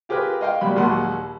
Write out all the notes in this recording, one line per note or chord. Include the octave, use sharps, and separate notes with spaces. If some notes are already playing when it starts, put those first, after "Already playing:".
F4 G4 G#4 A#4 B4
D#5 F5 G5
A#2 F#3 G3 B5
A#1 D#2 F#3 F#5 C6